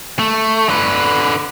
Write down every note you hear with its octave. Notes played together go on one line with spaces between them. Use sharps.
A3
D3 B4